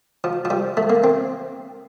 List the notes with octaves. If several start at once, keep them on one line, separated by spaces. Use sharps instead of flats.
F3
F3
G3
A3
A#3
C4